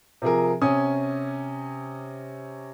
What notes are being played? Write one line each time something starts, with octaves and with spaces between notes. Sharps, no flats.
C3 F3 G#4 A#4
C3 C#4 G#5 D#6